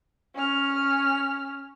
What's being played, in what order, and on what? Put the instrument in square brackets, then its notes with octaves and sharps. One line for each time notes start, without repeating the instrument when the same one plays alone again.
[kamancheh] C#4 F6